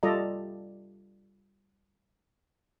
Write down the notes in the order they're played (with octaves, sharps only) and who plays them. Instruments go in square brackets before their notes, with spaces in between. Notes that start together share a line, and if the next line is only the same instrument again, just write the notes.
[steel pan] G3 F4 A4 D5 D#5 A#5